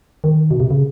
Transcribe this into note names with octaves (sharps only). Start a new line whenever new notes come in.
D#3
B2
C3
C#3